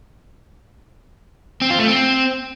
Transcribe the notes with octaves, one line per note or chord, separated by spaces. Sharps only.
C4
F4
A3
C4